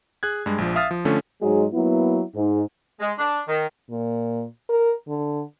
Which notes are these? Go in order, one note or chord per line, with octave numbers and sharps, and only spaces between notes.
G#4 F#6 G#6
G2 G#3
A#1 F3
E5 F5 D#6 F6 A6
F3
D3 F3 A3 C#4
G#2 F#3 G#3
F#3 A#3 B3 E4
G#2
G#3
D4
D#3
A#2
A#4
D3